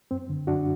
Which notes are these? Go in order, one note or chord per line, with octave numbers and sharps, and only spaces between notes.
F#2 C4
D3
F#2 D4 F#4